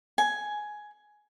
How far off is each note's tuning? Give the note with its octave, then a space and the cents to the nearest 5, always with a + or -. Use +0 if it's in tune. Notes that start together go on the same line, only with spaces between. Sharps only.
G#5 +10